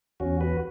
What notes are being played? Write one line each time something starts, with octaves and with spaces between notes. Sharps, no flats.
E2 C#4 F#4
F#4 B4